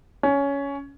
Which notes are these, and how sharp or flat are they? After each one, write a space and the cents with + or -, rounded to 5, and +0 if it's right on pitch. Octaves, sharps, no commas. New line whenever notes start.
C#4 +15